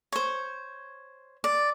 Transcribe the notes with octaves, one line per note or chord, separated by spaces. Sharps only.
C5 C#5
D5